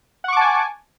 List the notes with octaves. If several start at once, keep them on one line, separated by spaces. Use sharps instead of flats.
F#5 G#5 A5 C#6 D6